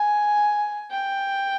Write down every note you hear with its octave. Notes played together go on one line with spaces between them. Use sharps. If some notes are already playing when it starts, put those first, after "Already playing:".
Already playing: G#5
G5